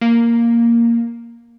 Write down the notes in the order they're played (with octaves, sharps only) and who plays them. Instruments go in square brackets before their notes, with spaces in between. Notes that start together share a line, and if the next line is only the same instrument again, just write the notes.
[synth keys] A#3